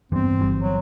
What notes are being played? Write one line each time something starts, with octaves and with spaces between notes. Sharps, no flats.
G2 E3 B3 C4
G1 D3 G3
F#3